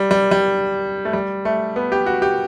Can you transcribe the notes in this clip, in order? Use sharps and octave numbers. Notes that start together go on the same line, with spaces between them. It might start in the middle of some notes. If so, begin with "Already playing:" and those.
Already playing: G3
G3
G3
A3
G3
A3
B3
G4
F#4
G4